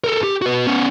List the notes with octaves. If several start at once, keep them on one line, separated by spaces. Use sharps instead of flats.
A4 A#4
G4
F#4 B4
B3 C#4